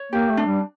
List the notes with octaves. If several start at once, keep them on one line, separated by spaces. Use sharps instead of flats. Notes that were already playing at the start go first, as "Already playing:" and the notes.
Already playing: C#5
A#3 G4
A3
D4
G3